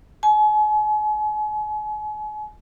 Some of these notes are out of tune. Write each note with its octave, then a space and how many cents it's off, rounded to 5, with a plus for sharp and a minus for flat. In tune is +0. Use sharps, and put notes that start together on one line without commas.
G#5 +40